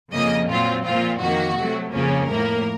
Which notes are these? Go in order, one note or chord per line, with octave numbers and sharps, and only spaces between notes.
F2 C#3 F3 A#3 D#5
A#2 F#3 C4 F4
A#2 F3 C4 F4
F2 D#3 A#3 F#4
C3 F#3 A3
F2 C#3 F3 A#3 C#4
A2 F3 A#3 A#4